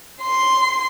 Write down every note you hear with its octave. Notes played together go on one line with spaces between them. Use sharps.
C6